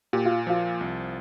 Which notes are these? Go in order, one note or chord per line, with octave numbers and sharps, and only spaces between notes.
A#2 G4
F4
F3 F4
C2